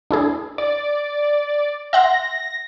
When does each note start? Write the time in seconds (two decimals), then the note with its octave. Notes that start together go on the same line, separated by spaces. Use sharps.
0.11 D4 E4 G#4
0.58 D5
1.93 E5 F#5 C6 A#6